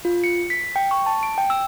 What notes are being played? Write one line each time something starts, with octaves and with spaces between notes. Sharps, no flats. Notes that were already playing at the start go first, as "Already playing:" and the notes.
F4
C#7
B6
G5
C#6
A5
D7
G5
E6